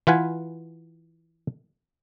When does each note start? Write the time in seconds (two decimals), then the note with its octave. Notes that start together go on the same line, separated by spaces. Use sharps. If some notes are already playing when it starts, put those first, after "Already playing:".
0.07 E3 F4 B4 F#5 G#5